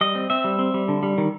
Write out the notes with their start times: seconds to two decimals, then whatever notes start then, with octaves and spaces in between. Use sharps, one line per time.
0.01 G3 D#5
0.15 C4
0.30 C4 E5
0.44 G3
0.59 C4
0.74 G3
0.88 D3
1.03 G3
1.18 D#3